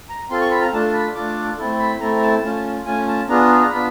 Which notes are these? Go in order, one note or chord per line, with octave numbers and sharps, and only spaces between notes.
A#5
C4 F4 A4 C6
C#6
B5
A#5
A3 D4 F4 A4 A5
B5
A3 D4 F4 A4 D6
A3 C4 E4 A4
B5
A3 C4 E4 A4 A#5
A#5
A5
A3 C#4 F4
A3 C#4 F4 G#5
A5
B3 D4 F4 G#4 A#5
A#5
B3 D4 F4 B5